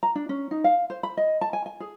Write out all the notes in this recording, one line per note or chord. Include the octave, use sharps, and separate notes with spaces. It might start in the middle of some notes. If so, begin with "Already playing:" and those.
A#5
D4
C#4
D#4
F5
C5
B5
D#5
A5
G#5
G#5
G#4